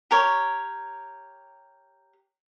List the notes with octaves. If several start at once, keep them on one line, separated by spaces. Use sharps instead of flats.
G4 A#4 C#5